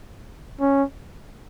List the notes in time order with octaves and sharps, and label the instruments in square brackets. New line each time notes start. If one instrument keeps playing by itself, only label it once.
[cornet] C#4